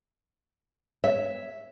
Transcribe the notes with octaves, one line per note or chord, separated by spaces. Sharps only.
C#5 E5